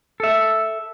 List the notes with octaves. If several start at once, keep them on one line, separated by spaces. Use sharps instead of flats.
A4 E5